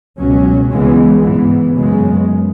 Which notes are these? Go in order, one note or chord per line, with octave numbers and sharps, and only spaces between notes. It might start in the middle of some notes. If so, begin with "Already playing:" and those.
C#2 B2 F#3 C#4
C#2 C#3 E3 G#3 B3
G#2 E3 B3
F#2 C#3 G#3 B3